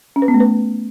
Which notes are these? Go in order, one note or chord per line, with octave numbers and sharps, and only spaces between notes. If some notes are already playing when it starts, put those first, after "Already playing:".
C#4
B4
B3
A3
B4